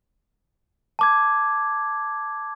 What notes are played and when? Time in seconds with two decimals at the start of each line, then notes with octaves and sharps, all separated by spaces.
0.99 A5 D6 G#6